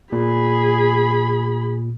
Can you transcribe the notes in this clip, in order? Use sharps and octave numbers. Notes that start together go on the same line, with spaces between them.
A#2 G#4 B5